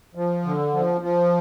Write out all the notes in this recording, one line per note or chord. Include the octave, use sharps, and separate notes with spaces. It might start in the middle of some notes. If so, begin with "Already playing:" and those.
F3
D3
F3
F3